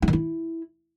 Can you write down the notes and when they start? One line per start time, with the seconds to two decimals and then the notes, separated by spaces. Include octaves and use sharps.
0.02 E4
0.08 D#3
0.13 E4